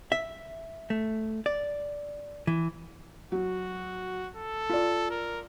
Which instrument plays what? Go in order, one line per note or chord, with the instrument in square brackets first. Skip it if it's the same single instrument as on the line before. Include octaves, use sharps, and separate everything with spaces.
[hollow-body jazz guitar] E5
A3
D5
E3
[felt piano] F#3 [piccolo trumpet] F#4
[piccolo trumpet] A4
[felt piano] F4 D5
[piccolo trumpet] A#4